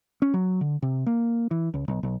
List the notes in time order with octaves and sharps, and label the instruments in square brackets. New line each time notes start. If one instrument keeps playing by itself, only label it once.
[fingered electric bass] C#4
F#3
D3
C3
A#3
E3
C#2
B1
B1